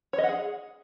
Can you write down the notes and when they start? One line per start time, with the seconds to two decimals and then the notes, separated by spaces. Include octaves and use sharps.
0.13 C#5
0.18 D#5
0.24 F#5
0.29 G#4